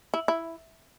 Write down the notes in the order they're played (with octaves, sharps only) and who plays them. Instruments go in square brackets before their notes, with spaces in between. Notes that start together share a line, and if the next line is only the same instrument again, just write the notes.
[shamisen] E4
E4